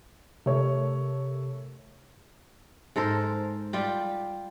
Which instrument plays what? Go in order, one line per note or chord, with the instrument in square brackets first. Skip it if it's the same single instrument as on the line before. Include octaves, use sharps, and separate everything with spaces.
[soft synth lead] C3 [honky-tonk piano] A3 A#4 C#5
[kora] G#2 A4 A#4 C5
G3 F4 G4